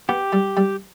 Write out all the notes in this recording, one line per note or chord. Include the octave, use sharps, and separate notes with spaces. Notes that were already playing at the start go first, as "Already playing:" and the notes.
B3 G4
G3
G3